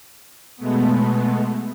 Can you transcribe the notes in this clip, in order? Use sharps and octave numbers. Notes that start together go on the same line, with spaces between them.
B2 G#3 A3 B3